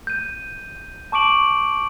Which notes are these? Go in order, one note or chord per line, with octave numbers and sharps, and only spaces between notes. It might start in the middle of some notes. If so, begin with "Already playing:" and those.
G6 D#7
A5 C#6 D6 D7 F#7